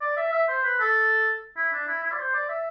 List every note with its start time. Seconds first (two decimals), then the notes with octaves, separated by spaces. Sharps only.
0.01 D5
0.17 E5
0.32 E5
0.48 C5
0.64 B4
0.79 A4
1.56 E4
1.72 D4
1.87 E4
2.03 E4
2.12 D5
2.19 C5
2.34 D5
2.49 E5